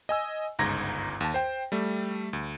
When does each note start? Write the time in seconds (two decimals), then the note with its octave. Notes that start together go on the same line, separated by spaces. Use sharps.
0.09 D#5 G#5 E6
0.59 G1 C#2 G#2 A#5 G#6 A#6
1.21 D#2 A5
1.34 C5 G5
1.72 G3 A3
2.33 D2